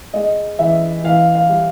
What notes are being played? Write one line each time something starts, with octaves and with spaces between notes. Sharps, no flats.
G#3 D#5
E3 E5
E3 F5
F5
G3